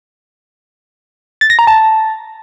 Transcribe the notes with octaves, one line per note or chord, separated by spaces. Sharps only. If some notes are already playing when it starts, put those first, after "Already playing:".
A6
A#6
A#5
A5